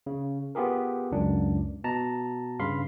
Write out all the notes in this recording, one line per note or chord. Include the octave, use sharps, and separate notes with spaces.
C#3
B3 F4 G4 G#4 A#4
C#2 F#2 D4
B2 A5 A#5
G2 C#3 F5 B5 C6